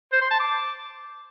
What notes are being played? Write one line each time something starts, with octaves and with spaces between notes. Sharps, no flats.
C5
C6
A5
D6